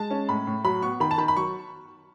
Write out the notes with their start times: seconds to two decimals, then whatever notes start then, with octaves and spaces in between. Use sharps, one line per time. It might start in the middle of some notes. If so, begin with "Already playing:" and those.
Already playing: G#3 A5
0.11 C#4
0.29 A2 B5
0.47 A2
0.64 F#3 B5
0.82 B3 C#6
1.00 D#3 B5
1.11 A5
1.18 D#3 B5
1.28 B5
1.36 F#3 C#6